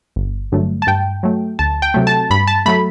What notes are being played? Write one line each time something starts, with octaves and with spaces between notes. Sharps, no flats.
G1
G2 D3 F#3 A3
A5
G2 G5
F#3 A3
D2 A5
G5
C3 F#3 A3
A5
G2 B5
A5
F#3 A3 B5